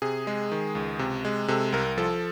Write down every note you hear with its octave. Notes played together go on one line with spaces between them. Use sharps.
C3 G#4
G#3
D#3
C#2
C3
G#3
C3 A4
C2 A#4
F3 A4